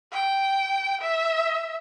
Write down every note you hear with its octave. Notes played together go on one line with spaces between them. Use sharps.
G5
E5